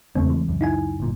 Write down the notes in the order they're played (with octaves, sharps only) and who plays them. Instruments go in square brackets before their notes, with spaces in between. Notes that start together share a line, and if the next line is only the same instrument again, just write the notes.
[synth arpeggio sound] E2 C#3 C4 [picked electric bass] G#3 A3
[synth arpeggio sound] E3
[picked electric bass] C#2 F#2
[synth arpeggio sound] D#4 E4 G#5
[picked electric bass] G1 A#2